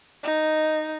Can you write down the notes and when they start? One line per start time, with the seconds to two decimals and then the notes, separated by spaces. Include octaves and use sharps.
0.23 D#4